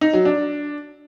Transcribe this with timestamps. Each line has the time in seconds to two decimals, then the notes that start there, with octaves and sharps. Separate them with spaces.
0.01 D#4
0.13 F#3
0.25 D4